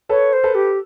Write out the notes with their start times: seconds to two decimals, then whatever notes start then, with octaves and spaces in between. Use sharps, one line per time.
0.09 A4 B4 C#5
0.33 C5
0.44 A4 B4
0.55 G4